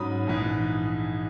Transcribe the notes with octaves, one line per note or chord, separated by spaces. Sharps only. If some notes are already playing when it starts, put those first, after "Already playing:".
Already playing: G#2 F#3 C#4 B5 D#6
A#1 G#2 E3